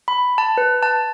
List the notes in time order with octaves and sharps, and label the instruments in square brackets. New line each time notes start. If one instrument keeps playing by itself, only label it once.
[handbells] B5
A5
B4
A5